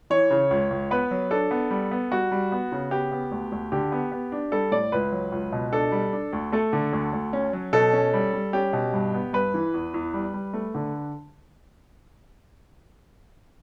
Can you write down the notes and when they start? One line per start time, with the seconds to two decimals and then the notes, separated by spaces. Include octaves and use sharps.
0.10 E3 C#5
0.30 C#3
0.51 C#2
0.71 C#2
0.91 B3 B4
1.11 F#3
1.31 D4 A4
1.51 B3
1.71 G3
1.91 B3
2.11 G3 F#4
2.32 G3
2.52 B3
2.72 C#3
2.91 B3 G4
3.12 B3
3.31 D2
3.52 D2
3.72 D3 G4
3.92 B3
4.12 B3
4.32 D4
4.52 G3 A4
4.71 A2 D5
4.92 C#2 B4
5.12 F#3
5.32 C#2
5.52 B2
5.72 D4 A4
5.92 G3
6.13 D4
6.33 D2
6.52 A3 A4
6.73 D3
6.93 D2
7.13 D2
7.33 C#4
7.53 F#3
7.73 B2 A4
7.93 C#4
8.14 G3
8.34 G3
8.53 C#4 G4
8.73 B2
8.93 G2
9.14 B3
9.33 G2 B4
9.54 E3
9.74 E2
9.94 E2
10.14 G3
10.34 G3
10.54 A3
10.75 D3